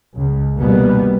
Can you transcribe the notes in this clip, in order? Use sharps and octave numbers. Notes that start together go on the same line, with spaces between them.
C#2
F1 B2 D#3 G3 A#3 B3